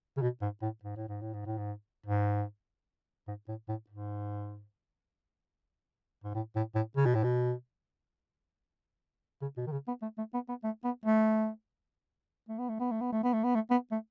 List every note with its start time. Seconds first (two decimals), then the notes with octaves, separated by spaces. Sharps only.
0.17 C#3
0.22 B2
0.42 G#2
0.62 A2
0.84 G#2
0.96 A2
1.08 G#2
1.21 A2
1.34 G#2
1.46 A2
1.58 G#2
2.06 G#2
3.28 G#2
3.48 A2
3.69 A2
3.90 G#2
6.24 G#2
6.35 A2
6.56 A2
6.75 A2
6.96 C#3
7.06 B2
7.15 A2
7.24 B2
9.42 C#3
9.57 B2
9.67 D#3
9.72 C#3
9.88 B3
10.02 A3
10.18 A3
10.34 B3
10.49 B3
10.64 A3
10.84 B3
11.06 A3
12.49 A3
12.59 B3
12.69 A3
12.80 B3
12.91 A3
13.01 B3
13.13 A3
13.24 B3
13.33 A3
13.44 B3
13.55 A3
13.71 B3
13.92 A3